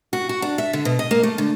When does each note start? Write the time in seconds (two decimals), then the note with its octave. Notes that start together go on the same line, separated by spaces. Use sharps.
0.13 F#4
0.29 F#4
0.42 D4
0.58 E5
0.73 D3
0.85 B2
0.99 D#5
1.11 A#3
1.23 A3
1.38 D3